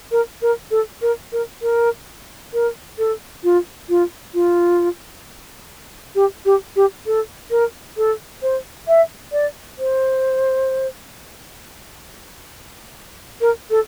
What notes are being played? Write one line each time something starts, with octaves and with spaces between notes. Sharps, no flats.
A#4
A#4
A4
A#4
A#4
A#4
A#4
A4
F4
F4
F4
G4
G4
G4
A4
A#4
A4
C5
E5
D5
C5
A#4
A4